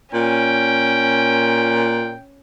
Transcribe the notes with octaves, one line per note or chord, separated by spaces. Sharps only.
A#2 C#4 G5